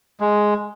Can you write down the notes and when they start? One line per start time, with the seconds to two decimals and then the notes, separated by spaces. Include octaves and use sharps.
0.20 G#3